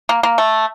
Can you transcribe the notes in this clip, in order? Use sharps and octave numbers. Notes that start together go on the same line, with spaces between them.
A#3
A#3
A3